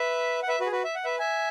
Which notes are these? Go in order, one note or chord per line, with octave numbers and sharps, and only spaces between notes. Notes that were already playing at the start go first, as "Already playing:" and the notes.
Already playing: B4 E5
F#5
B4 E5
F#4 B4
G#4
F#4 B4
E5
F#5
B4 E5
E5 G#5